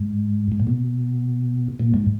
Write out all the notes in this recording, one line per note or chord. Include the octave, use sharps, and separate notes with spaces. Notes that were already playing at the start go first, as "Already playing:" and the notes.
Already playing: G#2
G#2
A#2
B2
A#2
G#2